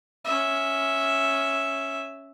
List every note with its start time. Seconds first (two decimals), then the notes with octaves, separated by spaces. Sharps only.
0.25 C#4 E5